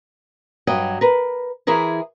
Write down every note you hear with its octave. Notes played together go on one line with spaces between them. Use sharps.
G2 F#3 D#5 G5
A#4 B4
E3 E4 G#4 A#4 C5